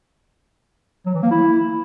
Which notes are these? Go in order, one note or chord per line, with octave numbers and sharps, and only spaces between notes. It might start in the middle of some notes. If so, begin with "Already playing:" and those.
F#3
E3
A#3
E4